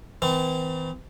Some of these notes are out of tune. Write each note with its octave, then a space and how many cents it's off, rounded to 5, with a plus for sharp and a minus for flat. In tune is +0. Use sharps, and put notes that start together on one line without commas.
E3 -35 C4 -40